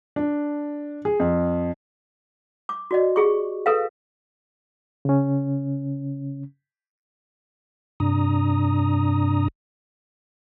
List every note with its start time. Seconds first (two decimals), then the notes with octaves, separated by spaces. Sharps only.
0.16 D4
1.05 G#4
1.20 F2
2.69 D6
2.91 F#4 D5 D#5
3.16 G4 G#4 C#6
3.66 A4 B4 E5 F5
5.05 C#3 C#4
8.00 G2 C3 D4 A#5 D#6